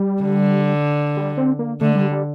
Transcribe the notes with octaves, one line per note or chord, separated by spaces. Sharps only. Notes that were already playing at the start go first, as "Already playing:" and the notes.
Already playing: G3
D3
G3
C4
A#3
D3 A3
G3
G3